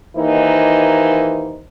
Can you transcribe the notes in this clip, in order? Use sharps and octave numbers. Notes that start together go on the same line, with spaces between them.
D#2 E3 A#3 D#4 C5